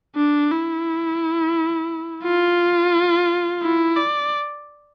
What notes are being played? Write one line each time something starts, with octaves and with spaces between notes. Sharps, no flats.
D4
E4
F4
E4
D5